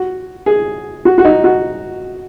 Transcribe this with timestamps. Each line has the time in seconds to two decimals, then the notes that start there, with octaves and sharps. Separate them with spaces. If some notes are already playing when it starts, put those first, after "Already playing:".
Already playing: F#4
0.46 G#4
1.05 F#4
1.18 F#4
1.25 D#4
1.44 F#4